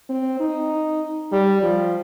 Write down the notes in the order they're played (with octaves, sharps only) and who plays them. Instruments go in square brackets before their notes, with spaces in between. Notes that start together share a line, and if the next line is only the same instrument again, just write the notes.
[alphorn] C4
D#4
G3
F3